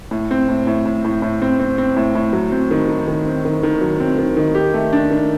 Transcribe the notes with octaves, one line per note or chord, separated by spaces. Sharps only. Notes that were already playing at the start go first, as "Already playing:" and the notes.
A2
C4
A2
A2
A2
A2
A2
C4
C4
C4
A2
A2
F#3
C4
D#3
D#3
D#3
C4
D#3
D#3
F#3
C4
D#3
D#3
G4
A3
D4
D#3